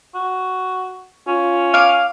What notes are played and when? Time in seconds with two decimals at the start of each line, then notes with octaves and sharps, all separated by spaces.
0.15 F#4
1.27 C#4 F4
1.74 F5 D6